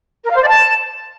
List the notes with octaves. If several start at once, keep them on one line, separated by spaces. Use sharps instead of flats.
A#4
F5
C5
D5
A5